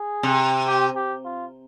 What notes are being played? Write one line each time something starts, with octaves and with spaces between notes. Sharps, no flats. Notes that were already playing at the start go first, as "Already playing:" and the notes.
Already playing: G#4
C3
G4
G4
F4